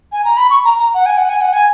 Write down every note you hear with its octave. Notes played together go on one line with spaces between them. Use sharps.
G#5
A#5
B5
C#6
A#5
A#5
F#5
G#5
F#5
G#5
F#5
G#5